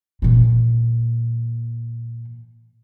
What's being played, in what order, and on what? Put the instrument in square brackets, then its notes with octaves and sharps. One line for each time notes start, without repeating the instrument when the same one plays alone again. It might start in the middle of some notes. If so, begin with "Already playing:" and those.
[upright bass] A#2 E3